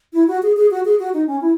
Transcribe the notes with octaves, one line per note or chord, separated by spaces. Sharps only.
E4
F#4
G#4
G#4
F#4
G#4
F#4
D#4
C#4
E4